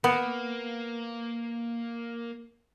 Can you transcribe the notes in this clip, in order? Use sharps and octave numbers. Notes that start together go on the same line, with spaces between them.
A#3 B3